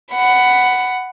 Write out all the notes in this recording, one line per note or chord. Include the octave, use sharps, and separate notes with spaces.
F#5 B5